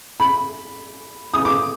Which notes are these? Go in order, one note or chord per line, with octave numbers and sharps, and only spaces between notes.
B5
D#6
D6